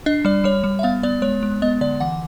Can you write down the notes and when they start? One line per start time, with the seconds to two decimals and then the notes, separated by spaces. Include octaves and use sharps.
0.06 D4 D#5
0.25 G3 D5
0.44 G3 C#5
0.64 G3
0.79 E5
0.83 B3 F5
1.03 B3 D5
1.22 G#3 C#5
1.43 G#3
1.62 B3 D#5
1.81 D3 D5
2.00 E3 F#5